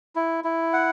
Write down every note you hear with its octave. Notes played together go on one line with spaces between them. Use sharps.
E4
E4
F#5